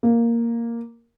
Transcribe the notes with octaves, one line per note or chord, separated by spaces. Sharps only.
A#3